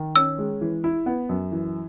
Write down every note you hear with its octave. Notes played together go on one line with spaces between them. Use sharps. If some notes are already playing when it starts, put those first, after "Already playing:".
Already playing: D#3
C#4 E6
G#3
E3
E4
B3
F#2
E3